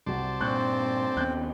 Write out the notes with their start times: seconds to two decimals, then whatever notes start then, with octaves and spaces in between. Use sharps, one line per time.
0.06 C2 F#4 C5 D5 A5
0.40 G2 A#2 C4 C#6 F#6 G6
1.17 D#2 B3 C#4 G5 F#6 G6